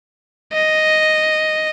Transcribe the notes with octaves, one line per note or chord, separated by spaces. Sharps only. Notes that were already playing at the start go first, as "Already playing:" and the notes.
D#5